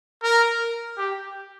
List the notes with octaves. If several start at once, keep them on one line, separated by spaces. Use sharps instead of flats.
A#4
G4